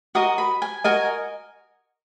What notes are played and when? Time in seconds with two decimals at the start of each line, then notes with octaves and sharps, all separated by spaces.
0.15 F#4 A#4 D#5 D#6
0.38 B5
0.62 G#5
0.84 F#4 A#4 D#5 G#5